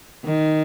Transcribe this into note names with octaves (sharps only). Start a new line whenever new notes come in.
D#3